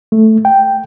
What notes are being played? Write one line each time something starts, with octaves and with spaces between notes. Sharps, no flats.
A3
G5